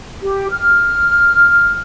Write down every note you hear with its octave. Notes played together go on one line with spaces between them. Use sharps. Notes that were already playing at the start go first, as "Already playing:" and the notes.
G4
F6